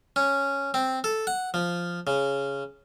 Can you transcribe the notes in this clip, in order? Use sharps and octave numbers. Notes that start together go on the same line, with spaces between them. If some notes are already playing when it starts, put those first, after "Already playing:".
C#4
C4
A4
F#5
F3
C#3